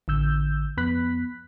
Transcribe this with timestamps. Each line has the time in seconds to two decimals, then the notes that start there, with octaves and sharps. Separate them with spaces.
0.08 A1 D3 E6 G6
0.77 F2 B3 B5 F#6 B6